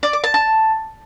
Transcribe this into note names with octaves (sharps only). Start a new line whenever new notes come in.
D5
D6
A5
A5